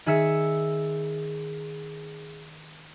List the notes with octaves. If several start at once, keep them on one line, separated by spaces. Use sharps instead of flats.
D#3 G#4 E5 E6 C#7